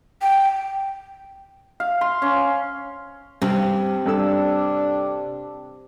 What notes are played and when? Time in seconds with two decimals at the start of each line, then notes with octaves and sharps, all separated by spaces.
0.22 G5
1.80 F5
2.01 C6
2.22 C#4
3.42 G2 C3
4.06 G2 D4 A4 E6